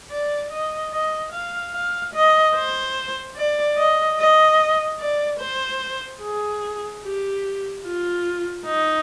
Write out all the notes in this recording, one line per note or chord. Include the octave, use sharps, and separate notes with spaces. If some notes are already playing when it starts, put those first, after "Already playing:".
D5
D#5
D#5
F5
F5
D#5
C5
D5
D#5
D#5
D5
C5
G#4
G4
F4
D#4